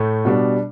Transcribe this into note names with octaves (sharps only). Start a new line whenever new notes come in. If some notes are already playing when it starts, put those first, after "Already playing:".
Already playing: A2 A3
B2 G3 D4